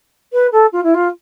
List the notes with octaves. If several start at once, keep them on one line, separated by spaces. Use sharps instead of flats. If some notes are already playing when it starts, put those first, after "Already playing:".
B4
A4
F4
E4
F4